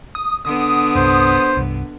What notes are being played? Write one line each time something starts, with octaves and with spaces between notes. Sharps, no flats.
D#6
D3 B3 D#6
C2 G2 C5
C2 G2